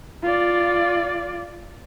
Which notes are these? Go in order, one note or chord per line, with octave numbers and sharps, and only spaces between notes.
F4 D5